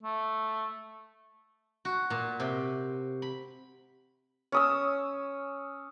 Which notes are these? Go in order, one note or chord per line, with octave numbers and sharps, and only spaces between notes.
A3
F#4
A#2
C3
B5
C#4 D#6 E6